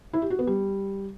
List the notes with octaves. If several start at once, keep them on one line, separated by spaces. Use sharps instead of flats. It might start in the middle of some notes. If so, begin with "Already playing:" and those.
E4
G4
F#4
B3
G3